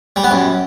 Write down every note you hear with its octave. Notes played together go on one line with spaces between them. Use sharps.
G3
B3
F#2